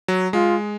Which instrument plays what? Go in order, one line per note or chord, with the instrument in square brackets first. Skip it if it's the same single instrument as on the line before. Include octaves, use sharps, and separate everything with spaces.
[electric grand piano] F#3
[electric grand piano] G#3 [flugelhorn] F4